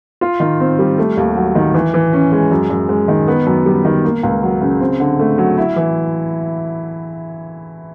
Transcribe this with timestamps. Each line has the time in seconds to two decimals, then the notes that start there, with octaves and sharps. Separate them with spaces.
0.21 F4
0.40 D#3
0.60 C4
0.79 G3
0.98 A3
1.17 D#2
1.36 F#3
1.55 D#3
1.74 E3
1.94 E3
2.13 C#4
2.32 G#3
2.51 F#2
2.70 F#2
2.89 G#3
3.08 D#3
3.28 B3
3.46 F#2
3.66 G3
3.85 D#3
4.04 A#3
4.23 C#2
4.43 F#3
4.61 C#3
4.80 C4
5.00 D3
5.19 A3
5.38 F#3
5.57 E4
5.76 E3